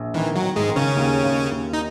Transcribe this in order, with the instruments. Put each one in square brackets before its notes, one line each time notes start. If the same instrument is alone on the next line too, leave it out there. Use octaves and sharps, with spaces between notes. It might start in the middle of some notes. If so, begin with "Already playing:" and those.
Already playing: [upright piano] A#1
[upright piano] D#3 [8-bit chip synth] E3
[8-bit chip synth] F#3
[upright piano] D#3
[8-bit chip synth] G#2 G#3
[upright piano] D#3
[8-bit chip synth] C#3 C#4
[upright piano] D#2
D#2
D#2
[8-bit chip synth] D#4